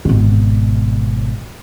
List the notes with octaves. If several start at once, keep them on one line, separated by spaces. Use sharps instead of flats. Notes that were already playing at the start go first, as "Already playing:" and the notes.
G#1 B2